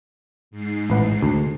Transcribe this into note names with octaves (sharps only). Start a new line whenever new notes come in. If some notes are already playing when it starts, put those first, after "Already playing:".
G#2 C7
A1 B4 F#5
D2